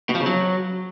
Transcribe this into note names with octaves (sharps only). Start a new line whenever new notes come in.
B2
F3
C#3
F#3